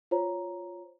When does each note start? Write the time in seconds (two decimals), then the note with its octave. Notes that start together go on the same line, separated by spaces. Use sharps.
0.11 F4 C5 C#5 A#5